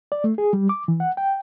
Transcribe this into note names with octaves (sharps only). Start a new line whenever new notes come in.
D5
A3
G#4
G3
D6
E3
F#5
G5